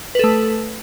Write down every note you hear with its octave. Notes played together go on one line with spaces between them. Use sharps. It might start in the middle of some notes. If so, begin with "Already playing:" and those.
A3 A4 B4